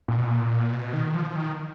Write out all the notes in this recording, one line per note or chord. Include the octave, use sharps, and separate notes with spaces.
A#2
B2
A#2
B2
D#3
F3
D#3